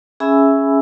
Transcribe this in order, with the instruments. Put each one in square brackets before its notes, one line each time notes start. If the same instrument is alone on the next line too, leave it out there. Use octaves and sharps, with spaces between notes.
[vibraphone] C#4 G#4 E5 G#5 B5 E6